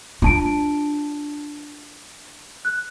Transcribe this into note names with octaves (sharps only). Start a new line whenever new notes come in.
D4 F4 A5 D7
F#6